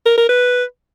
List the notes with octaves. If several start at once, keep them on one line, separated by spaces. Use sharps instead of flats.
A#4
A#4
B4